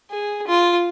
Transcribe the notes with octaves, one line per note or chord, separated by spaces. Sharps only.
G#4
F4